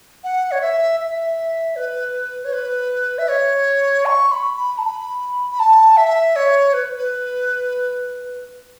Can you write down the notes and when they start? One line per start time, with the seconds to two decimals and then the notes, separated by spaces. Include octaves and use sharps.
0.24 F#5
0.51 C#5
0.61 E5
1.00 E5
1.76 B4
2.44 C#5
2.53 B4
3.18 E5
3.29 C#5
4.06 C#6
4.31 B5
4.57 B5
4.78 A5
4.83 B5
5.51 B5
5.59 A5
5.97 E5
6.36 C#5
6.73 B4
6.97 B4